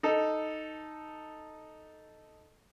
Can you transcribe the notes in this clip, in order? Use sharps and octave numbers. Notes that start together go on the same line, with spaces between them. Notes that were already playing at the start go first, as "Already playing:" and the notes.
D#4 A4